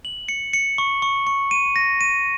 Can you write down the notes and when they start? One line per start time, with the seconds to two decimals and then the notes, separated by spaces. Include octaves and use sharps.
0.05 F#7
0.29 C#7
0.53 C#7
0.78 C#6
1.02 C#6
1.27 C#6
1.51 D#7
1.76 A#6
2.01 D#7